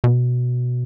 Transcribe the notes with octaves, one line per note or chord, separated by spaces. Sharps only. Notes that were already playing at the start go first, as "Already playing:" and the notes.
B2